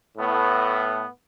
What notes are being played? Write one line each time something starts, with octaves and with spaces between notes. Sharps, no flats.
A2 B3